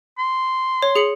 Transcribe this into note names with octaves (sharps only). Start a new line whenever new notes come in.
C6
C#5
G#4 C#7 F#7